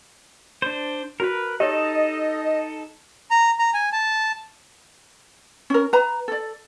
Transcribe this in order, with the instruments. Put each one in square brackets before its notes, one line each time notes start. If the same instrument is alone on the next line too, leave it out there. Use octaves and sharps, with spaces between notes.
[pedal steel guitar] D4 C5
[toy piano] E4 F#4 [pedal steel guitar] A#4 B4
[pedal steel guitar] D#4 A4 [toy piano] G4 C#5 [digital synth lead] D#5
[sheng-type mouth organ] A#5
A#5
G#5
A5
[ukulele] C#4 A#4
B4 A#5
A4 D5